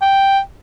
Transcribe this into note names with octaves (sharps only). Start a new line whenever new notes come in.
G5